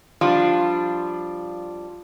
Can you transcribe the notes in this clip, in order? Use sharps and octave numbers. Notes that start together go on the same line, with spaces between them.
F3 G3 D4 F4